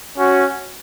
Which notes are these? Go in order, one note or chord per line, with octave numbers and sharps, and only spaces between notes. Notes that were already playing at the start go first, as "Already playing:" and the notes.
C#4 F#4